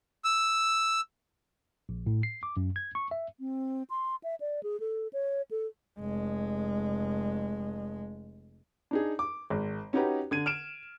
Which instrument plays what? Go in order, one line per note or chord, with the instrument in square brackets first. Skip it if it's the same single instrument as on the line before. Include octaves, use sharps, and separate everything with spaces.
[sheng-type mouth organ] E6
[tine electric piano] A#1
A2
C7
D6
F#2
G#6
C#6
E5
[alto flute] C4
C6
E5
D5
G#4
A4
C#5
A4
[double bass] F1 G#3
[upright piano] D4 D#4 G#4
D6
G#1
C#4 D#4 F#4 G4 B4 A#5
D3 G#6 D#7
F6 D7 E7